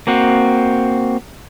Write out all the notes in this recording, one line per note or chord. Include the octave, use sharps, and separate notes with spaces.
A#3 C4 F#4